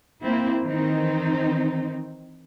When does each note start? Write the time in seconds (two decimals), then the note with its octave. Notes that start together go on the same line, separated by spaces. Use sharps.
0.23 A#3 C4 E4
0.65 D#3 E3 C4 D#4